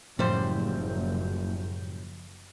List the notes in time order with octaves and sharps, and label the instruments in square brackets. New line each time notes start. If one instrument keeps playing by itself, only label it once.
[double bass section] F#1 [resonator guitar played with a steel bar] F#2 G3 C5 [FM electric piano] A2 G6 [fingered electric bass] F3